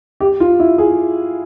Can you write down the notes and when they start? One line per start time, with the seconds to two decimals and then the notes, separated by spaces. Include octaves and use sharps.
0.20 G4
0.40 F4
0.60 E4
0.78 G#4